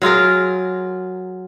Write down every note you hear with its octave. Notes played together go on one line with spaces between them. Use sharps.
F#3 F4 G#4 A#4